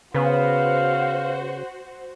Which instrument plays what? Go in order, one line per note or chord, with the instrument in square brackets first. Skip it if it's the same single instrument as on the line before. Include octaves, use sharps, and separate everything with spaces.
[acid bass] C#3 [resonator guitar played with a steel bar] B3 B4 [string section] F#4 C5 [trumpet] F5